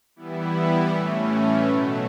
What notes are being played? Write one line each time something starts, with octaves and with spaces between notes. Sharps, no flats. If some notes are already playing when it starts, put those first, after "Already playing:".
E3 G3 B3 E4
A2 E3 A3 C#4
B2 F#3 A3